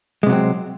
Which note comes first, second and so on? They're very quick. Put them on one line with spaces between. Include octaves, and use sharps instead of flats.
G#3 C3 F#3 C4